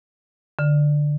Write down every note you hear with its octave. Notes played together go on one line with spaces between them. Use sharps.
D3